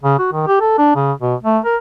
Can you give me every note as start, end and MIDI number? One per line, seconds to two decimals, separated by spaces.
0.03 0.16 49
0.19 0.29 66
0.33 0.46 51
0.47 0.58 67
0.61 0.74 69
0.78 0.94 62
0.96 1.12 49
1.21 1.35 47
1.43 1.59 57
1.65 1.77 70